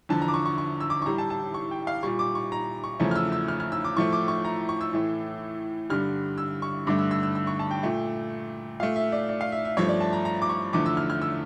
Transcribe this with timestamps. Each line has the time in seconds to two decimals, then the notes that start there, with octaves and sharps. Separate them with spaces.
0.09 E2 D3 F3 A5
0.21 A#5
0.28 D6
0.34 C#6
0.46 C#6
0.58 C#6
0.80 E6
0.90 D6
1.02 C#6
1.06 A2 G3 A#5
1.18 A5
1.30 A5
1.54 C#6
1.71 G5
1.87 F5
2.03 A#2 G3 C#6
2.19 D6
2.35 C#6
2.52 A#5
2.84 C#6
3.00 E2 C#3 F3 A3
3.11 F6
3.16 E6
3.32 E6
3.48 F6
3.60 F6
3.72 E6
3.84 D6
3.96 A2 F3 A3 C#6
4.13 D6
4.28 C#6
4.45 A#5
4.69 C#6
4.81 E6
4.93 A2 E3 A3
5.90 G2 D3 G3 F6
6.38 E6
6.62 C#6
6.87 G2 D3 A3 D6
6.99 E6
7.11 E6
7.23 E6
7.35 E6
7.47 C#6
7.59 A5
7.71 G5
7.83 A#2 A3
8.80 A#2 A3 F5
8.96 E5
9.12 D5
9.29 D5
9.41 F5
9.52 E5
9.65 E5
9.77 G2 F3 A3 C#5
9.89 D5
10.00 A5
10.13 A#5
10.25 A#5
10.42 D6
10.49 C#6
10.73 E2 D3 F3 A3 D6
10.86 E6
10.97 F6
11.10 F6
11.22 E6